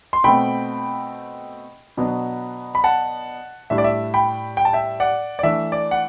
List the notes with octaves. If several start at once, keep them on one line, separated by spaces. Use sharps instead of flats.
C6
B2 A3 C4 G5 B5
B2 F#3 B3 D4
B5
F#5 A5
A2 G3 D4 E5
D5
E5
G5 B5
G5
A5
E5 G5
D5 F#5
D5
E3 A3 D4 E5
D5
F#5